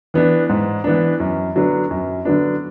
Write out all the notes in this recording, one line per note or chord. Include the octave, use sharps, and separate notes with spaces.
E3 B3 D4
G#2
E3 B3 D4
F#2
D3 F#3 B3 D4
F#2
D3 F#3 B3 D4